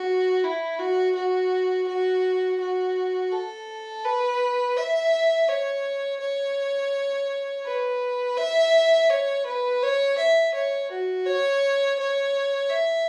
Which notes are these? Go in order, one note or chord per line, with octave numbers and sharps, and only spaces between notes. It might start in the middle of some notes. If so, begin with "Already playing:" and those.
Already playing: F#4
E4
F#4
F#4
F#4
F#4
A4
B4
E5
C#5
C#5
B4
E5
C#5
B4
C#5
E5
C#5
F#4
C#5
C#5
E5